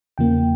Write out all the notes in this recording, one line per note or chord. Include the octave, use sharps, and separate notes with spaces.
E2 C#3 F3 A#3 G5